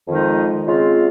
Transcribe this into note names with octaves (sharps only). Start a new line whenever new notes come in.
F2 D#3 G#3 D#4
C#3 G#3 C4 F4